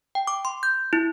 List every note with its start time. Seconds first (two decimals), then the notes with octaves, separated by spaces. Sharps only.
0.15 G5
0.27 D6
0.45 C6
0.63 G6
0.93 E4